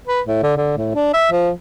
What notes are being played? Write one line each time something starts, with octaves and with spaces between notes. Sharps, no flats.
B4
A2
D3
D3
A2
D4
E5
F3